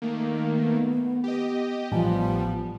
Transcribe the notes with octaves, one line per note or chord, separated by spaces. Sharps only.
D#3 A3 A#3
B3
G4 D#5
A1 F3 G3 B3